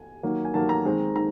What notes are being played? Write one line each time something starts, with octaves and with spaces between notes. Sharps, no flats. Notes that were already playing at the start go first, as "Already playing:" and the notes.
Already playing: G#5
D#3 F#3 A#3
G#5
D#3 F#3 A#3 A5
A#5
D#3 G#3 C4
D#3 A#5